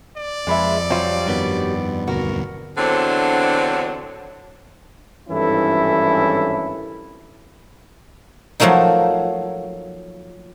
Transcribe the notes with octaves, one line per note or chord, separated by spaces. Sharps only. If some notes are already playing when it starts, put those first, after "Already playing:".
D5
F2 G#3 B4 E5
F#3 G3 C4 F4
G2 D#3 B3
E1 D2 C4 F#4 A#4
E2 D3 F#3 C4 D4 C5
G#1 G2 E3 C#4 E4 A4
F3 F#3 A3 A#3 D#4